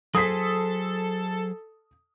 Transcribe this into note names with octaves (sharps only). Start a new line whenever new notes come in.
F#3 G#4 A4 C5 D#6 B6